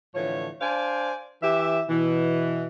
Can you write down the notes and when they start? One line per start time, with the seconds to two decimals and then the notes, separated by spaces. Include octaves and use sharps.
0.15 A2 D3 E3 F3 C#5
0.61 D4 C5 D5 F5 G5 G#5
1.43 E3 G4 E5
1.89 B2 E3